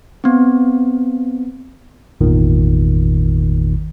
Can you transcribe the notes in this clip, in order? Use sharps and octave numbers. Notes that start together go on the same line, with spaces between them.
B3 C4
G#1 E2 A#2 D#3